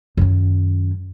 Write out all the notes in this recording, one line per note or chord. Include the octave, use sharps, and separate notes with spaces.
F#2 D#3